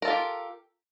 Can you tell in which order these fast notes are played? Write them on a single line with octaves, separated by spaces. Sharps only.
A#4 A4 F4 G4